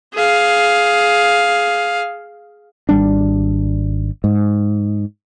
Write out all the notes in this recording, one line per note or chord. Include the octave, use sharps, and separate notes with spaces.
G#4 F5
G#1 G3 D4
G#2